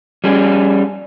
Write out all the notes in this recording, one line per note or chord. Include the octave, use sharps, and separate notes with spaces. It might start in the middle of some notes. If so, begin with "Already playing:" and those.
G3 C#4 G#4